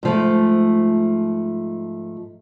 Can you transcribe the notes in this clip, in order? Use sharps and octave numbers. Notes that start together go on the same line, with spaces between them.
G#2 F3 A3